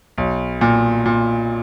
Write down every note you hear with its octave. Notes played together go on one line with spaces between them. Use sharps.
B1
A#2
A#2